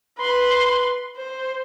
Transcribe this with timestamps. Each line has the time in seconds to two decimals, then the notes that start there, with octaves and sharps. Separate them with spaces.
0.19 B4 C6
1.17 C5